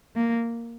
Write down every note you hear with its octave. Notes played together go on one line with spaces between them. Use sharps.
A#3